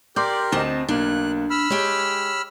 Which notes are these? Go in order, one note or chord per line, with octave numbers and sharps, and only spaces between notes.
G4 A#4 D5 C6 D6 G6
D2 C4 D#5 A5
B1 A#3 D4 F#6
B5 E6 F6
G#3 G4 C#5